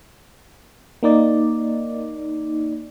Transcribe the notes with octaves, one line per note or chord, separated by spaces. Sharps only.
A#3 D#4 D5